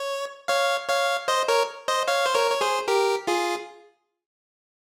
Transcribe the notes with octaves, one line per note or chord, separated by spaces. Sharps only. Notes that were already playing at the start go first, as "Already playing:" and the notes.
Already playing: C#5
C#5 F5
C#5 F5
C5 D#5
A#4 C#5
C5 D#5
C#5 F5
C5
A#4 C#5
C#5
G#4 C5
G4 A#4
F4 G#4